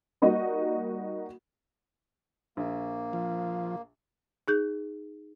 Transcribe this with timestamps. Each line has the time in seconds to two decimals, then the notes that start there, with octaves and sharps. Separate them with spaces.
0.22 G3 A#3 D#4 F#4 D#5
2.57 A#1 A#3
3.13 F3
4.48 D#4 G#4 G6